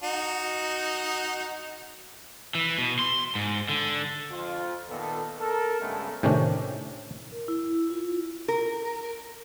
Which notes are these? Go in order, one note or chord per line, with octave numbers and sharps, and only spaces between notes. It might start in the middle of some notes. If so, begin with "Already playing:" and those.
D#4 F#4
E3
B2
C6
G#2
D3
F2 F4
A#2 D#3 B3 A4
A4 A#4
G2 C#3 G#3 A3 B3 C#4
A2 C3 D#3 C#4 D4
A#4
E4
F4
A#4